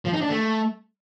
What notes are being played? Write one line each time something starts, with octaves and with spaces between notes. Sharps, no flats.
F3
D#4
D4
A3